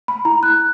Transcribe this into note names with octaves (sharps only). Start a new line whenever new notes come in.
B5
E4 A#5
F#6